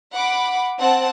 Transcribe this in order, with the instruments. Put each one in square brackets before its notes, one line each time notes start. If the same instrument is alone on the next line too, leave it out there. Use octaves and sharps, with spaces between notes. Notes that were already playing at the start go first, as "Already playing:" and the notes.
[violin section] F#5 B5 D6
C4 F#5 A5